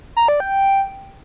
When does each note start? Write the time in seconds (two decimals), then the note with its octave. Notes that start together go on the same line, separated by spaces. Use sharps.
0.17 A#5
0.28 D5
0.40 G5